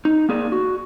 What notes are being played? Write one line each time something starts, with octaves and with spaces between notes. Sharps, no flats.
D#4
A#3 G#4 D5
F#4